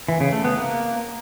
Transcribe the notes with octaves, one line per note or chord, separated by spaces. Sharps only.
E3
C#3
A3
B3
A#3